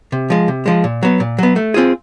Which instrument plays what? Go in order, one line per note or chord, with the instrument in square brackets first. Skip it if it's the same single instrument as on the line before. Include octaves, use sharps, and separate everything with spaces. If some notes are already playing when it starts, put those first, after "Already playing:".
[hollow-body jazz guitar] C3
F3 G#3
C3
F3 G#3
A#2
F#3 B3
A#2
F#3 B3
A3
C4 F4 G#4